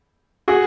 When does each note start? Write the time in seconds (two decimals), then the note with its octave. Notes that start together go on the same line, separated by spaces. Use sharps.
0.48 F#4 G#4